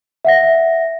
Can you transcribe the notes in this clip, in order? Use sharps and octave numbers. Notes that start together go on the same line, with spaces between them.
E5 F#5 A#6